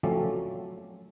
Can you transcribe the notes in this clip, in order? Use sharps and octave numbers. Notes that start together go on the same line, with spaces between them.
F3 F#3 A3 C4 C#4 D5